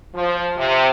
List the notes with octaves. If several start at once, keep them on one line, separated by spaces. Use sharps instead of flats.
F3
C3